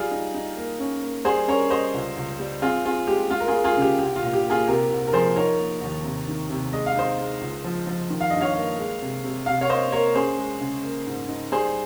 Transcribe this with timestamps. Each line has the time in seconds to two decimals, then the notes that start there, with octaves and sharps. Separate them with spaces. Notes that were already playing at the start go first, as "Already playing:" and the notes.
Already playing: G3 F4 G#4
0.11 D#4
0.35 D#4
0.57 A#3
0.79 C#4
1.03 A#3
1.25 G3 G#4 C5
1.48 C#4 A#4 C#5
1.71 G3 C5 D#5
1.94 C#2
2.16 C#2
2.39 G3
2.62 C4 F4 G#4
2.85 C4 F4 G#4
3.07 G#3 G4
3.30 G#3 F4
3.40 A#4
3.48 F4 G#4
3.54 G#3
3.64 F4 G#4
3.77 C#3 G4
3.98 C2 G4
4.16 F4
4.22 A#2
4.33 G4
4.44 A#3
4.50 F4 G#4
4.67 C3 G4 A#4
4.90 C2
5.07 A#4
5.13 F3 G#4 C5
5.36 D#4 A#4 C#5
5.59 A#3
5.81 D#2
6.04 C3
6.28 D#3
6.50 C3
6.72 G#3 D#5
6.86 F5
6.96 D#4 C5 D#5
7.18 G#3
7.41 C#2
7.64 F3
7.87 F3
8.10 D#3
8.21 F5
8.30 G2 D#5
8.41 C#5 F5
8.55 A#3
8.78 G#3
9.01 C3
9.24 C3
9.46 C3 F5
9.61 C#5 F5
9.69 A#3 C5 D#5
9.92 A#3 A#4 C#5
10.15 C#4 G#4 C5
10.38 G#3
10.61 C#3
10.83 A#3
11.07 G#2
11.29 D#4
11.52 G3 G#4 C5